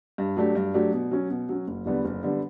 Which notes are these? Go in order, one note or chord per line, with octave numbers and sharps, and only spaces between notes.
G2
F#3 A3 D4 G4
G2
F#3 A3 D4 G4
B2
F#3 C#4
B2
F#3 C#4
F#1
E2 D3 G3 B3
F#1
D3 G3 B3